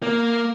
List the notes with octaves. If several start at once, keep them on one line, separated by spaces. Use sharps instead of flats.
A#3